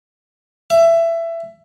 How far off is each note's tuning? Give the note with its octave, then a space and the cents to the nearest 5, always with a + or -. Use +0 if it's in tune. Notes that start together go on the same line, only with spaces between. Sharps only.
E5 +20